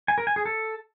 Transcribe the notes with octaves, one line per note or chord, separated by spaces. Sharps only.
G#5
A#4
G#5
G#4
A4